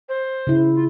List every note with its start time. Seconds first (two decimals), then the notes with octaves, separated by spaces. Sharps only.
0.09 C5
0.47 C#3 E4
0.74 F4